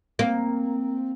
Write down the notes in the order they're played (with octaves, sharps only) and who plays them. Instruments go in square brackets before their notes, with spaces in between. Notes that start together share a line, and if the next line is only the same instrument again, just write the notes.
[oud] A#3 [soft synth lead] C4